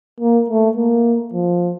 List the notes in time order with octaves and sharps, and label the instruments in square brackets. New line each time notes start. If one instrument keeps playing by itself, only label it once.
[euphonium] A#3
A3
A#3
F3